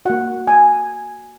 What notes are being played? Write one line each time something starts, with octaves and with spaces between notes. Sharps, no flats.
A#3 F#4 F#5
G#5